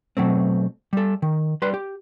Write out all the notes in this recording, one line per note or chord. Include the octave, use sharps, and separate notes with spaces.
B2 F#3 A3 C4
G3 A4
D#3
G3 B4 C6
G4